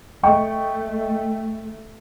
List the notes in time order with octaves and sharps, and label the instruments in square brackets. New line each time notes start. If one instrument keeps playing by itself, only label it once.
[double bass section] A3 [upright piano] D#5 G5 C#6